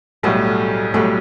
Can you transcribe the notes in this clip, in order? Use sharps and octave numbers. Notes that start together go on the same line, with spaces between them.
B1 A2 F#3 G3 A3
B1 A2 F#3 G3 A3